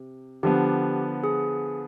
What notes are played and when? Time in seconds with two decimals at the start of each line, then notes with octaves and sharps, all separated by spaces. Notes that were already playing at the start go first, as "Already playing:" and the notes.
Already playing: C3
0.43 D3 F3 B3 G4
1.24 G#4